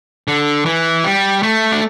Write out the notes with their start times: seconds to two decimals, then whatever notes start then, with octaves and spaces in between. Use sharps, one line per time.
0.28 D3
0.65 E3
1.04 G3
1.43 A3
1.72 D4